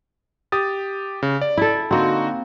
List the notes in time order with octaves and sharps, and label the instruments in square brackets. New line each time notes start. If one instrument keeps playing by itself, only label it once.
[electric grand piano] G4 D#6 A6
C#3
D5
[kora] E4 A4
[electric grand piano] D3 D#4 F#4 [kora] A#3 C4